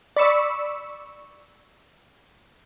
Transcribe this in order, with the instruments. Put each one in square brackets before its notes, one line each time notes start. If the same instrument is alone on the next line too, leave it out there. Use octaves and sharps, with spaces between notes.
[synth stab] D5 B5 C#6 E6